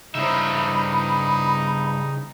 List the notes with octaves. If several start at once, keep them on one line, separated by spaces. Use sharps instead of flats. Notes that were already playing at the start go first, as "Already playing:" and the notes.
G2 C#3 D#4 E4 C5 E5 B5